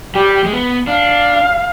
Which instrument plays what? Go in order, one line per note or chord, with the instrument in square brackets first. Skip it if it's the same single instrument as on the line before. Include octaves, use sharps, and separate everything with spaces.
[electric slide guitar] G3 [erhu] G4
[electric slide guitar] G#3
B3
[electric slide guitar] D4 [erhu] F5